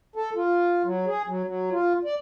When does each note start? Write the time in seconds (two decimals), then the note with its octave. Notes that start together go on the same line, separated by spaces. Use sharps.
0.16 A4
0.36 F4
0.84 F#3
1.06 G#4
1.27 F#3
1.45 F#3
1.72 F4
2.05 D5